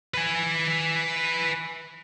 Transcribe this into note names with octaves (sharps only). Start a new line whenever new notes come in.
B4 G#5